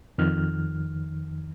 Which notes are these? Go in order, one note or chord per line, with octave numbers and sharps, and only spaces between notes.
F2 D#3 F6